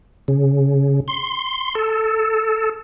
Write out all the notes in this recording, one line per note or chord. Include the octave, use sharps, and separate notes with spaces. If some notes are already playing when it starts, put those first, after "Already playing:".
C#3
C6
A4